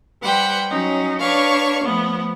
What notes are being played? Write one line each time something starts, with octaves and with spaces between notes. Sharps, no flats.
G3 B4 C5 F#5 G5
F#3 C#4 D#4
D4 B4 C#5 F5 C#6
F3 A3 B3